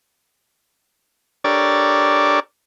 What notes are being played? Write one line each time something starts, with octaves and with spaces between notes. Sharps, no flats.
D4 G4 A4 A#4 C#5 D5